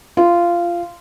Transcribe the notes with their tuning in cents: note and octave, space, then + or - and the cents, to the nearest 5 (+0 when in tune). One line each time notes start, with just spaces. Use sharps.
F4 -15